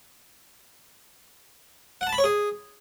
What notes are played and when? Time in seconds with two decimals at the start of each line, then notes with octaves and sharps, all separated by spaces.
2.01 F#5
2.07 A5
2.13 B5
2.18 C#5
2.24 G#4